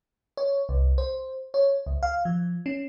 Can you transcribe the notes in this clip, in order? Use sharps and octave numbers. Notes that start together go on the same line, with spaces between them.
C#5
C2
C5
C#5
C#2
F5
F3
C#4